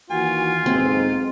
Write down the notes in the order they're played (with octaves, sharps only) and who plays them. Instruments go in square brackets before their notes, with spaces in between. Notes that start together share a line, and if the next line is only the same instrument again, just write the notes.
[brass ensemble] D#2 E3 F#4 [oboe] F4 [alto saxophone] G#5
[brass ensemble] B1 G#2 [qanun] C4